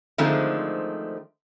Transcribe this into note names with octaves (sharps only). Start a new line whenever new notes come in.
D3 D#3 F3 G#3 A3 C4